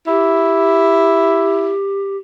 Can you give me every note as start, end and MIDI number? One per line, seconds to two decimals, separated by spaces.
0.07 1.74 64
0.07 2.17 67